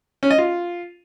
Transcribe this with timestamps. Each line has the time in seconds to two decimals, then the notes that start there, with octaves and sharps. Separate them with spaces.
0.23 C#4
0.31 D#5
0.38 F4